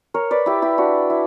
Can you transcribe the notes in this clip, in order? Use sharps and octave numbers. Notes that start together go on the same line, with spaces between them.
A#4 C#5
B4 D5
E4 G4
E4 G4
D4 F#4
E4